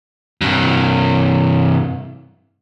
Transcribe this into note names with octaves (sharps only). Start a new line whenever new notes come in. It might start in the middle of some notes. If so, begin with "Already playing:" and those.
G2 C3